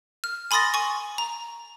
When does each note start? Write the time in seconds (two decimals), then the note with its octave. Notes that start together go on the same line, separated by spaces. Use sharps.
0.24 F6
0.51 G#5 B5 C6 D#6 A6 A#6
0.74 G#5 C#6
1.18 A#5